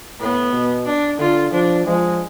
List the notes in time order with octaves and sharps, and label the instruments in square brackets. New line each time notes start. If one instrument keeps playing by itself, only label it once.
[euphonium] A2 [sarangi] B3
[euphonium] B2
[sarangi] D4
[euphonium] D3 [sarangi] F4
[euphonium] F3 [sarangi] D4
[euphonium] F3 [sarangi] G#3